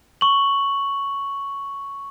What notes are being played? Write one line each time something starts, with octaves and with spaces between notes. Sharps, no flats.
C#6 F#7